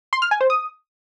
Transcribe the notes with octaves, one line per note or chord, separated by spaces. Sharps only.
C6
F6
G#5
C5
D#6